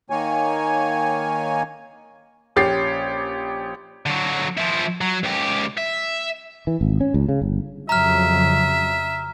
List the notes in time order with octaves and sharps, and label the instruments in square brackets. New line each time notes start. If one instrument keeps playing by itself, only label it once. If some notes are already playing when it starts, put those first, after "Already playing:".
[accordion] D#3 A#3 C#5 G#5
[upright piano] A#1 C#4 G4 A6 C7
[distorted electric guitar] D3 F#3
F3 E4
F#3
C#2 G4
E5
[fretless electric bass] E3
G#1
C#4
C#2
C#3
G1
[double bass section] F2 C#3 F#3 [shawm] E5 [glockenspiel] A#5 F6